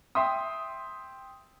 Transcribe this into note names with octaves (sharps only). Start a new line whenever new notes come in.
E5 G5 C6 D#6